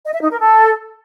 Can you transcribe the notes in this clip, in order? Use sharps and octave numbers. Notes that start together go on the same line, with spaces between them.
D#5
E5
D#4
A#4
A4